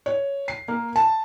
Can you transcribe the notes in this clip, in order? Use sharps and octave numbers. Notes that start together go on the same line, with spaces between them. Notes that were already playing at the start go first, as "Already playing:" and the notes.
C#5
C7
A#3
A5